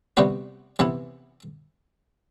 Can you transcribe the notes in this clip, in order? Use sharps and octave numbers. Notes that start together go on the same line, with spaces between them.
C3 G3 B3 F#4 B4
C3 E3 B3 E4